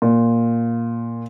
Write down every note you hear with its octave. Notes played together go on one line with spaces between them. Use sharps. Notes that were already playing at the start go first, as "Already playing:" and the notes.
A#2